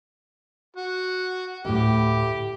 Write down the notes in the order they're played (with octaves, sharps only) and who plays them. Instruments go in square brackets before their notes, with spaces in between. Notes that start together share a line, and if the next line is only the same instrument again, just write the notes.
[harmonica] F#4
[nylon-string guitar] D2 A2 [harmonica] G4